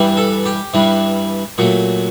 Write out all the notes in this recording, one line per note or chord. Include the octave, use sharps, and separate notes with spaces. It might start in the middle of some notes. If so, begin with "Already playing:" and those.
Already playing: G2 E3 G3
A4
G4
G2 E3 G3
A#2 F#3 A3